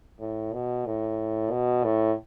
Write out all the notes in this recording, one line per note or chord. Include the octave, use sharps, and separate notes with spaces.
A2
B2
A2
B2
A2